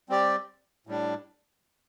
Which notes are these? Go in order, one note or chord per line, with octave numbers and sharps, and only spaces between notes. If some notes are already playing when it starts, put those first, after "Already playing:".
G3 C4 G4 D5
A2 G3 D4